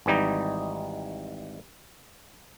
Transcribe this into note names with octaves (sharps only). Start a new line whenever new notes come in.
G#1 E3 G3 D#4 D#5